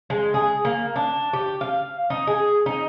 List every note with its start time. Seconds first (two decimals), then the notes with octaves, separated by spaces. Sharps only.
0.10 G#3
0.34 G#4
0.65 A#3
0.96 D4
1.33 G4
1.61 F5
2.10 D#4
2.27 G#4
2.66 D#4